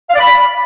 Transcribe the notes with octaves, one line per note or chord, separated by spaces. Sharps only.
F5
D5
B5